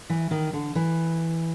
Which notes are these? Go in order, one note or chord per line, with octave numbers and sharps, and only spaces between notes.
E3
D#3
D3
E3